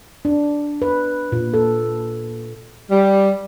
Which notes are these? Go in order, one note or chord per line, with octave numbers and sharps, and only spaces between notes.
D4
B4
A#2
A4
G3